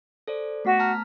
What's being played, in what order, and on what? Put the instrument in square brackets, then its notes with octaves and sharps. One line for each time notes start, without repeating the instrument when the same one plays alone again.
[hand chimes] A4 C5 D5
[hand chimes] A3 B3 B6 [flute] F#4
[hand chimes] A5 A#5 F6